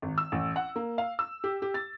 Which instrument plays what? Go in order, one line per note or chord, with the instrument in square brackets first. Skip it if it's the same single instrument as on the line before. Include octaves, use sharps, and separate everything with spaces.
[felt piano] G#1
E6
A1
F#5
A#3
F5
E6
G4
G4
A6